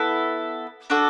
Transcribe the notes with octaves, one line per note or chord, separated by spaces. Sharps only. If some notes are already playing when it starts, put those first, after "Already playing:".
Already playing: B3 E4 A4
D4 F#4 A4